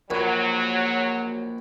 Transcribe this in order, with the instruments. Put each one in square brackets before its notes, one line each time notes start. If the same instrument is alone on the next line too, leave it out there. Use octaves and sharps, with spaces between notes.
[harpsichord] A#1 [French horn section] F#3